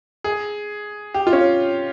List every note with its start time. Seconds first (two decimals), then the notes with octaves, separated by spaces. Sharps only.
0.24 G#4
1.14 G4
1.27 F4
1.33 C#4